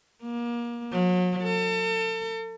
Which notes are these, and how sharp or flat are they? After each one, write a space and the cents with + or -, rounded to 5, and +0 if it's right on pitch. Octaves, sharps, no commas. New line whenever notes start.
A#3 +30
F#3 -40
A4 +35